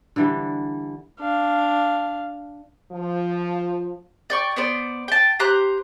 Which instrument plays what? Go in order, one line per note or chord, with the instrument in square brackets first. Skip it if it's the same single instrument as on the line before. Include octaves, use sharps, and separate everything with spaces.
[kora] D3 E3 G3
[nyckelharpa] D4 F5
[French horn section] F3
[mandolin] D5 G5 C#6
B3 C5 D5
G5 A5
G4 C5 A#5 F#6